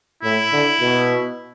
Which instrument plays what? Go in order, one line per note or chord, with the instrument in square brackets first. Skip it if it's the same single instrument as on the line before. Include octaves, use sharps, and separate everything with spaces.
[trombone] A2 [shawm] E4
[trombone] D3
B2